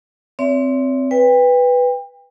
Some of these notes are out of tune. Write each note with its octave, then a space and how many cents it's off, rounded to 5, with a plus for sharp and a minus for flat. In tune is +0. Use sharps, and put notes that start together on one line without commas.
C4 +0 C#5 +45 E5 +0
B4 +0 G5 +35